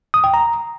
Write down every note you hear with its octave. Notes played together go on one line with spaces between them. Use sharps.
D#6
G5
A#5